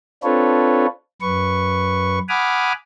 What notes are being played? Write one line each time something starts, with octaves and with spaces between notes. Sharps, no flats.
C4 D4 F4 A4 B4 C#5
F#2 B4 C#6
F#5 G#5 B5 D6 D#6 F6